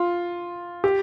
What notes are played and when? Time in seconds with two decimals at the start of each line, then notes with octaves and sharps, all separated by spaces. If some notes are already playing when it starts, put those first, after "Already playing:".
Already playing: F4
0.84 G4